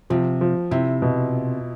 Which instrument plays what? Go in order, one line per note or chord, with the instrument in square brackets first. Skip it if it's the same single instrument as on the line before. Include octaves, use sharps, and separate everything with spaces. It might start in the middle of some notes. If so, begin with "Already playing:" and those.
[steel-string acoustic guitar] C3 [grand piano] F3
[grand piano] F3
[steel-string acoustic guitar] C3 [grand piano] E4
[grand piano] B2